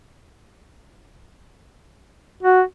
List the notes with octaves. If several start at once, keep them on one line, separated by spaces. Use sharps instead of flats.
F#4